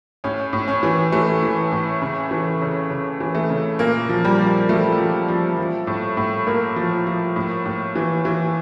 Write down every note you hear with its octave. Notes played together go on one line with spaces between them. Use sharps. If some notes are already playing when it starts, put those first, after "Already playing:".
A2 C#4
A2
C#4
E3
E3 A3
E3
A2
C#3
E3
C#3
C#3
E3
A3
C#3
A#2 A#3
F3
G3
F3
F3 A3
F3
F3
F3
A2
A2
A2 A#3
F3
F3
A2
A2
E3
E3